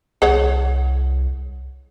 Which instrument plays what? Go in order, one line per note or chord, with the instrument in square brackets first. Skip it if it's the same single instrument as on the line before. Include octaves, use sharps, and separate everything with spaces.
[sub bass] C2 [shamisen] G#4 C#5 F#5